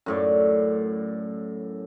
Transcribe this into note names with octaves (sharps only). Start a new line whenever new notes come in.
F#2 A2 D5